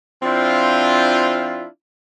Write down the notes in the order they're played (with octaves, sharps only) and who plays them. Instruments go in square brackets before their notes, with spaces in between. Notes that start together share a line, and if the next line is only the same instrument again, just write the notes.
[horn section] F3 C4 D4 E4 F4